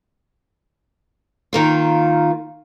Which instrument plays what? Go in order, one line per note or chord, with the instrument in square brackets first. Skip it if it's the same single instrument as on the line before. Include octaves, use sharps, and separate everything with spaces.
[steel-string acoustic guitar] D#3 A#3 F4